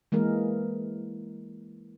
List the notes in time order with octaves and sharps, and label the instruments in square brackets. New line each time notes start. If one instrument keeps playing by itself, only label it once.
[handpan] E3 G#3 A#3 A#4